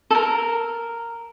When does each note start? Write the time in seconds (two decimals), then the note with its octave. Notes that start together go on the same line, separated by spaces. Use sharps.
0.10 A4
0.15 A#4